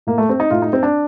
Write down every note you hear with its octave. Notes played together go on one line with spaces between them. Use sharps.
A2 A#3
A3
C4
D#4
A2 F4
D#4
C4
D4